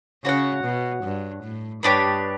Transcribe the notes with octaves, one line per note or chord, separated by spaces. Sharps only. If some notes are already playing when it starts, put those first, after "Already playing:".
C#3 F#4 C#5 F#5
B2
G2
A2
G2 B3 D4 G4 C#5